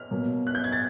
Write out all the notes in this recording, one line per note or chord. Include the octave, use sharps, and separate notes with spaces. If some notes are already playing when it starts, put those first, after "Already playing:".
Already playing: F6
B2 F#3 A#3
F#6
G6
G#6
A6